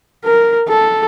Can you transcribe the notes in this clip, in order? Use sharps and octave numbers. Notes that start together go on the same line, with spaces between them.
A#4
A4